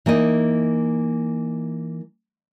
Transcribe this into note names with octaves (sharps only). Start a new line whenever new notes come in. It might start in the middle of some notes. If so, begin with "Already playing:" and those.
E3 A#3 D#4 D#5